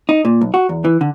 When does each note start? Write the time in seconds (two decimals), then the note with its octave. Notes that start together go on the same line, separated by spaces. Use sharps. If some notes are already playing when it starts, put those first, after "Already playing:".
0.09 D#4
0.25 A#2
0.41 B1
0.54 F#4
0.69 E2
0.85 E3
1.01 D3